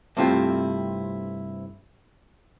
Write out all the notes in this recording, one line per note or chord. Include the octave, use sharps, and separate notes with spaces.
G2 C3 A3 C4 E4 F4